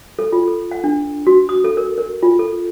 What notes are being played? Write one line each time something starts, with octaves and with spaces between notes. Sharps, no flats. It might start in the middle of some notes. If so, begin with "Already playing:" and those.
A4
F4
A4
F#5
D4
F#4
D#6
A4
A#4
A#4
F4
A4